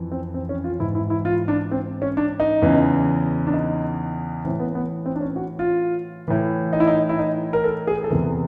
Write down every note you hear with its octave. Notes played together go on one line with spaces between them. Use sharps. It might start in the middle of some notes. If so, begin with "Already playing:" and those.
Already playing: F2 E3
C4
C4
C#4
F4
G#2 E3 E4
E4
E4
F4
D4
C4
C#4
D4
D#4
E2 C#3 E3
D4
D#4
A2 E3 C4
B3
B3
C4
D4
C#4
F#4
F4
A2 E3
D#4
E4
D#4
E4
D#4
A#4
A4
G#4
A4
E2 C3 E3 A#4